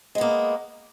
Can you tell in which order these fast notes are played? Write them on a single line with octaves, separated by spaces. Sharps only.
G#3 B3 A#3